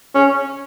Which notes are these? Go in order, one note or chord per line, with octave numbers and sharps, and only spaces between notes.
C#4